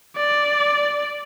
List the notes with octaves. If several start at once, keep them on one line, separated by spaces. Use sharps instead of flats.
D5